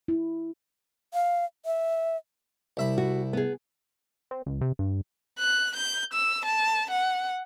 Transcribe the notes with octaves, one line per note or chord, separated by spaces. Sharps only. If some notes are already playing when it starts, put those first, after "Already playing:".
E4
F5
E5
C2 E5 B5
F#4
B3 G#4
C4
C#2
C3
G2
F#6
G6
E6
A5
F#5